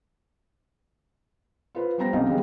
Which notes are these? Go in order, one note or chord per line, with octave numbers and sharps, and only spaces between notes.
F4 B4 C5
G3 B3 C5 A#5 A#6
B1 C3 C#4 D#4 F5
D#3 G3 G#3 B3